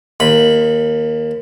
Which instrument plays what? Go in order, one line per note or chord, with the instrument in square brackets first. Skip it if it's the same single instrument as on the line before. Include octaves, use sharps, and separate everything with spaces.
[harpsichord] D#2 B5